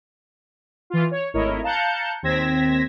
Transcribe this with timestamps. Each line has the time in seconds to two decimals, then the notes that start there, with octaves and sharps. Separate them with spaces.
0.90 E3 F4
1.11 C#5
1.34 G#1 A2 E4 A#4 C#5 D#5
1.64 F5 A5 A#5 F#6 G6 C#7
2.23 D#2 C4 G#6 A#6 B6 E7